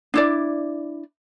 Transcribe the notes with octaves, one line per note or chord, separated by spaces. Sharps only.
D4 E4 D5